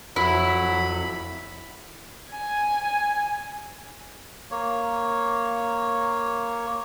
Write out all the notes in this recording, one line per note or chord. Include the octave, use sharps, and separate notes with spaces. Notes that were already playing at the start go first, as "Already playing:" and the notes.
F2 F#3 E4 B5
G#5
A#3 C#5